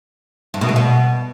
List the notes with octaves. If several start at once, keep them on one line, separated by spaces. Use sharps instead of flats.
G2
B2
D3
B2